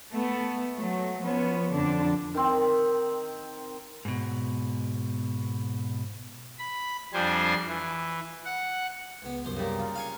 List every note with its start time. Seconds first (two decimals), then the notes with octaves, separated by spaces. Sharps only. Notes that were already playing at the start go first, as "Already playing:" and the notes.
0.12 A3 B3
0.76 F#3 A3
1.21 F3 B3 C#4
1.72 F2 D3 D4
2.35 D#3 C4
4.05 G#2 B2
6.59 B5
7.13 F2 G3 D4 C5 G#5 C6
7.68 E3
8.45 F#5
9.22 C#2 B3
9.45 C2 F#2 C5
9.56 C#3 G3 A#3
9.80 F4
9.96 F5 G#5 C#6